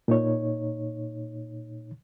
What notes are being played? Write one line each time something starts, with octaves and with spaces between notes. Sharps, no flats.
A#2 D#4 C#5